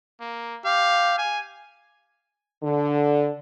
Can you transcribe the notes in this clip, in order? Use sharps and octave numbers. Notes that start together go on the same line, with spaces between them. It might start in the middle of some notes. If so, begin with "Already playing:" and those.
A#3
G4 F5
G#5
D3